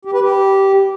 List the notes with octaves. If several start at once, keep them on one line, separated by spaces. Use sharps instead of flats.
G4
B4
G4